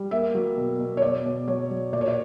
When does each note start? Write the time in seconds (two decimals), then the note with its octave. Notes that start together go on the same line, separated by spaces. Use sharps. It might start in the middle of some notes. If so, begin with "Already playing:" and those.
Already playing: G3
0.11 A#3 E5
0.35 F#3
0.57 B2
0.80 B2
0.97 C#5
1.02 B2 D5
1.25 B2
1.48 F#3 C#5
1.71 F#3
1.93 A#2 D5
2.01 C#5
2.08 D5